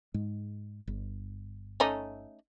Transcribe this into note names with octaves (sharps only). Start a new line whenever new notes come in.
G#2 G#3
G1
A3 C#4 D#4